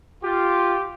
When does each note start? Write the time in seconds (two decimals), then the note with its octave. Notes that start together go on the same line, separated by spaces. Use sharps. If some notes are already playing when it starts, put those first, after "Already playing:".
0.24 F4 G4